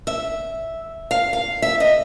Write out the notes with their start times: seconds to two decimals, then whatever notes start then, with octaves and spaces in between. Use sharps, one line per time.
0.07 E5
1.11 F5
1.33 F5
1.62 E5
1.80 D#5